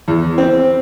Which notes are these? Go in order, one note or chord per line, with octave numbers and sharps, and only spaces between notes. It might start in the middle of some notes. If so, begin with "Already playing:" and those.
E2
C4